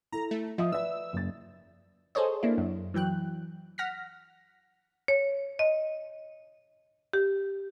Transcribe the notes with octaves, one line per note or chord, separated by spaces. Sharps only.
E4 A4 A#5
A3
F3 D#5 E5 D#6
B4 D5 E5 E6
F#1 A6
G#4 A4 C5 C#5 D#5
A#3 D4 E4
F#2
E3 F#3 G5 F#6
F#5 F6 A#6 B6
C#5
D#5
G4